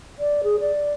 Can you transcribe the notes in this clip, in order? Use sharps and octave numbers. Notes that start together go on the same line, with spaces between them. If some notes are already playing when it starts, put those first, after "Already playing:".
D5
G#4
D5